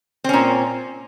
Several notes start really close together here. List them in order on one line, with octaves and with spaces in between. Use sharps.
C4 C#4 A#2